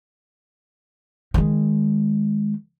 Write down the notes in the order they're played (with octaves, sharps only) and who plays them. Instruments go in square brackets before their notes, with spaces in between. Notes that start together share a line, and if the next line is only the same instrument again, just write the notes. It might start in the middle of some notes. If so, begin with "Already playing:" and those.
[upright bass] D#3 G#3